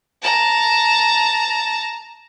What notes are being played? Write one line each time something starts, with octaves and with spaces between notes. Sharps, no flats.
A5 A#5